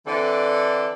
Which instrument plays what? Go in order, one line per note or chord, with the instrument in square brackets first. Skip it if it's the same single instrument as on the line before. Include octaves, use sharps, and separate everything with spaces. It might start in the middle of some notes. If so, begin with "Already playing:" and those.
[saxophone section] D3 E3 C4 A4 D5